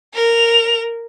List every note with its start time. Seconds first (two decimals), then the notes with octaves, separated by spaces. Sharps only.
0.14 A#4 F7